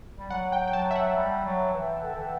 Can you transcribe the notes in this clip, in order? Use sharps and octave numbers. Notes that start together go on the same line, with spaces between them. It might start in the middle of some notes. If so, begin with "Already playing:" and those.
G3
F#3 F#5
G5
G5
F#3 A5
E5
F#5
G3
F#3
E3
D3
E3